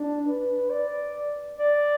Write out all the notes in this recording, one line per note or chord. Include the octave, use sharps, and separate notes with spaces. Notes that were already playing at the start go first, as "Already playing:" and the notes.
Already playing: D4
B4
D5
D5